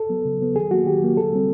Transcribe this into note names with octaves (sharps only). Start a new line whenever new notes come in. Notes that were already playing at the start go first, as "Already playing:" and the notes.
Already playing: A4
F#3 B3
C#3
F#3 B3
D#3 G#4
F#3 A#3 F#4
D#3 G4
F#3 A#3
D3 A4
G3 C4